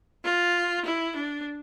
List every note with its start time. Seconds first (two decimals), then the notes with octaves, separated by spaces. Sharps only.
0.24 F4
0.85 E4
1.16 D4